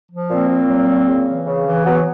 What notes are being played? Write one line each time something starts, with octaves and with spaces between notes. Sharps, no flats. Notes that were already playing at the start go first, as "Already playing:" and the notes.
F3
A#2 A#3 C4
A#2
F#3
A#2
C#3
E3
C#3
E3
F#3 B3